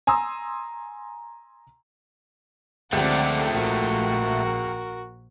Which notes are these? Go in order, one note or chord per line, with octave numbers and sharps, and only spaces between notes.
G#5 A#5 C6 D#6 E6
C#2 D3 F3 A3 C4 G4 D5 F#5
A#1 F#4 A#4